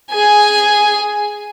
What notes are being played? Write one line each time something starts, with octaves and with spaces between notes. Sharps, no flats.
G#4 G#5